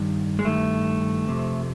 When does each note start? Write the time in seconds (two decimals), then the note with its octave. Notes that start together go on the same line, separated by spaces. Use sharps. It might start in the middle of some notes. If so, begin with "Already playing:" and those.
Already playing: G2 D#3
0.39 G#3
0.45 G2 D#3 A3
1.28 F2 C3